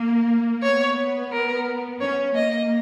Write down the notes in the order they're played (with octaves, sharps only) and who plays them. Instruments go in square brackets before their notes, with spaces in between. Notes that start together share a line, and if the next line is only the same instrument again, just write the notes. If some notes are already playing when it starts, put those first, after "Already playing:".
Already playing: [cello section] A#3
[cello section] B3 [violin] C#5
[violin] A#4
[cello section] C#4 [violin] C#5
[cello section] A#3 [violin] D#5